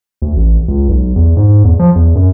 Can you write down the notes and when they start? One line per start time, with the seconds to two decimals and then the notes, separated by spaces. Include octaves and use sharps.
0.22 D2
0.36 A1
0.68 C#2
0.89 B1
1.16 E2
1.37 G#2
1.64 E2
1.79 F3
1.95 E2
2.15 F#2